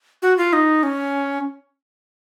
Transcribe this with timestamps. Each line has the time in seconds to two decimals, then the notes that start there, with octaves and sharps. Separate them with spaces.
0.22 F#4
0.38 F4
0.53 D#4
0.83 C#4